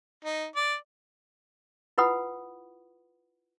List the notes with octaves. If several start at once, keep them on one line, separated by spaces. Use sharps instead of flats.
D#4
D5
E4 F4 B4 F#5 B5 D#6